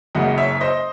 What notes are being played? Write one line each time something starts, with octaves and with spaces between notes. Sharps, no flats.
F#1 F#2 C#3 G#3 D#5 F#5
C#5 E5
C5 D#5